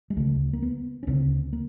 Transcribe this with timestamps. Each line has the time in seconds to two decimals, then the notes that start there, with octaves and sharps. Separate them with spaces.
0.10 G#3
0.17 D2 C#3 A3
0.53 A#3
0.62 B3
1.03 C#4
1.07 D2 C#3 C4
1.53 A#3